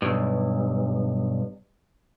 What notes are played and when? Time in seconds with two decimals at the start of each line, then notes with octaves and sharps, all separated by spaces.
0.02 B1 G2